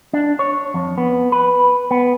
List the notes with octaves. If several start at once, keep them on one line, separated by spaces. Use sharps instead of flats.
D4
C#5
F2
B3
B4
B3